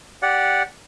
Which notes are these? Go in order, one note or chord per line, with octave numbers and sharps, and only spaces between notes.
G4 D5 F#5